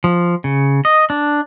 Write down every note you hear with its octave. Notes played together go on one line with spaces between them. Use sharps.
F3
C#3
D#5
D4